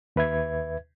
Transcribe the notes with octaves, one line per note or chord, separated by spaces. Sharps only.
D#2 B4 E5 G#6